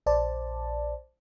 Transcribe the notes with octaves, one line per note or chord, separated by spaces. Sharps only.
A#1 C5 D5 A5